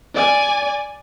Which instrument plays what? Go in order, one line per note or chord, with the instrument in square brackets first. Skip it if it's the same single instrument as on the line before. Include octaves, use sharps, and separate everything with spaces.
[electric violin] D5 G#5